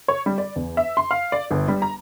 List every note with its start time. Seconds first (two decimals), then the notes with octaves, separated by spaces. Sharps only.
0.08 C#5
0.26 G3
0.38 D5
0.56 E2
0.77 E5
0.97 C6
1.11 F5
1.32 D5
1.51 G1
1.68 G3
1.82 A#5